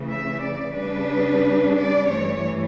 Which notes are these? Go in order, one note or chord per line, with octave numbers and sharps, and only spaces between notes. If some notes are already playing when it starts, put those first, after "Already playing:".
Already playing: C#3 E3 A3
E5
D5
C#3 G3 D4 B4
D5
G2 E3 A3 C#5